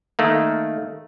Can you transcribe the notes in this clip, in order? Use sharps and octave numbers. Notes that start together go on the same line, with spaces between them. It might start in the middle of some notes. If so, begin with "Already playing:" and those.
D#3 A3 A#3